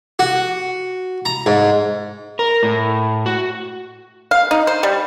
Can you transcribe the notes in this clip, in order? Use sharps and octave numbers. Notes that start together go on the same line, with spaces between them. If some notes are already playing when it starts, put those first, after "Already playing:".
F#4
A#5
G#2
A#4
A2
F#4
F5
D#4
C5
G3